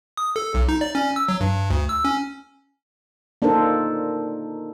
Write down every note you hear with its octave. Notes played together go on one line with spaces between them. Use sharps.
D#6
A4
B1
D#4
D5
C#4
E6
F#3
G2
D2
E6
C#4
A#3 D4 D#4 A4 A#4 C5